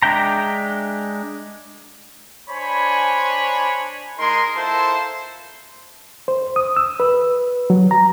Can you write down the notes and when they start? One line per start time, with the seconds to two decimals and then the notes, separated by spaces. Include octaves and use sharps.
0.02 G#3 D4 E5 G5 A#5
2.50 D4 C5 C#5 G#5 B5
4.19 G#3 D#4 G#4 A#4 C6
4.56 E4 F4 A4 A#4 C5 A5
6.28 C5
6.56 D#6
6.77 E6
7.00 B4
7.70 F#3
7.91 A#5